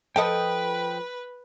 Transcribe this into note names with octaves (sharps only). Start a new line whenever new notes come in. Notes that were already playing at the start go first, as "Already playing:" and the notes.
F3 A4 B4 D#5 G5 D#6